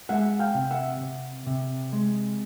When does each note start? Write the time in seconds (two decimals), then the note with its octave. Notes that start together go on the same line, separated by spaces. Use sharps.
0.09 G#3 E5 F#5
0.39 F5 G5
0.55 C3
0.71 E5 F#5
1.01 C3
1.47 C3
1.93 G#3